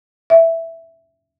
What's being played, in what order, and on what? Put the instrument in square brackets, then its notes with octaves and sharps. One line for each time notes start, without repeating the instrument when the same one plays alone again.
[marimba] E5